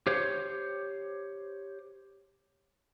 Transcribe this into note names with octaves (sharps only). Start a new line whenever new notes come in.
G4 C5 C#5